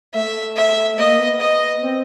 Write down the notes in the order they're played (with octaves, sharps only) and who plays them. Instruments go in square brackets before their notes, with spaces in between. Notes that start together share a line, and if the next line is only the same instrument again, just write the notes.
[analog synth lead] A3 [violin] E5
[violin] E5
[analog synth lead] A#3 [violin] D#5
[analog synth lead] B3
[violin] D#5
[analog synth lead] C4